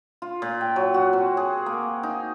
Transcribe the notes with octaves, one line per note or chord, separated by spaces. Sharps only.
F4
A#2
G5
F#3
F#4
C4
G#4
A#3
D#4